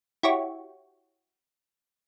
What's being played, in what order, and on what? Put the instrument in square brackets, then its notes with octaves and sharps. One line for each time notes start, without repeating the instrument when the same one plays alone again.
[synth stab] E4 F#4 G4 C#5